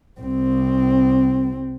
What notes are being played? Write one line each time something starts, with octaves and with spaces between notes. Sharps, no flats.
C2 C4